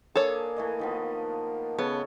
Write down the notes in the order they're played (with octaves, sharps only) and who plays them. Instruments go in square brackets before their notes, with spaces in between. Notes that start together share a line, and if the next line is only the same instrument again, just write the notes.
[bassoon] A#3 [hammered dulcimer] D4 G#4 B4 [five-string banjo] A4 C#5
[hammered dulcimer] E3 A3 D#5
D#3 F3 B3
[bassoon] C#3 [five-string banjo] B3 [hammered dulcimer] A4 C#5